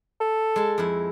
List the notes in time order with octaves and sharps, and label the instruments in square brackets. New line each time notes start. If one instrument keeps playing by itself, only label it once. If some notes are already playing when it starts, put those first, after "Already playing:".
[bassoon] A4
[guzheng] G#3 A5
F2 E4